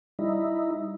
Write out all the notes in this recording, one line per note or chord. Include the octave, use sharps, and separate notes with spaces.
G3 D#4 E4